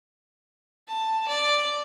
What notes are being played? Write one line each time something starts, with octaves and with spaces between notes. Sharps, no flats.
A5
D5